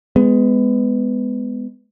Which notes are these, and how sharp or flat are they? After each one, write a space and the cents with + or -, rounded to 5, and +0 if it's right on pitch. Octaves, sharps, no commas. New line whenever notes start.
G#3 +0 B3 +15